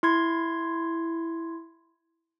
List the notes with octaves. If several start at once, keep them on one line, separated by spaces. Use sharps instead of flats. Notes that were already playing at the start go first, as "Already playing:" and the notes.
E4 C6 G#6